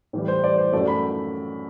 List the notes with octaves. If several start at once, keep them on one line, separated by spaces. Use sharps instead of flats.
A2 E3 G3
C5
D5
C5
F#2 F#3 A3 D5
B5